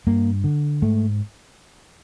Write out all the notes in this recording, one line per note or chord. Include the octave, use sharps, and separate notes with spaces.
G2 A#3
D3
G#2 A3